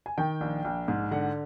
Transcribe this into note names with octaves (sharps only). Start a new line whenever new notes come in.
G#5
D#3 G5
A#1
A#1
G#2
D3 F#5